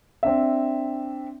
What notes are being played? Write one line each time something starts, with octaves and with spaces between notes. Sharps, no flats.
C4 D4 E5